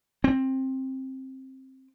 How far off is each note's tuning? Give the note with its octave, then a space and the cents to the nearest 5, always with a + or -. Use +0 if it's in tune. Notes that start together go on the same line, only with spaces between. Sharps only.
C4 +15